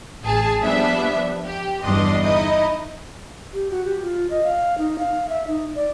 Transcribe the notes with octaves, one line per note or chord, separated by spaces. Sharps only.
A1 G#4 A5
F3 G3 B3 D4 E5
G4
G1 E2 G2 D4 D#5 C6
D#4 E4 D#5
G4
F#4
G4
F4
D#5
F5
D#4
F5
E5
D#4
D5